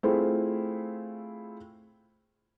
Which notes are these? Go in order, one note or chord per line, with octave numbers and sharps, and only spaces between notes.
A3 C4 E4 F4 G#4 C5